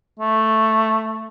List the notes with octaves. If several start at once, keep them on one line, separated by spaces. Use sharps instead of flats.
A3